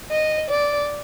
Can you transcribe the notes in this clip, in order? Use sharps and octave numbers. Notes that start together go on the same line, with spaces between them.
D#5
D5